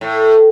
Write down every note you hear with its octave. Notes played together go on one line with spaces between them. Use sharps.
A2